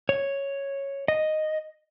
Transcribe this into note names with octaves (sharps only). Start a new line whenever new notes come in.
C#5
D#5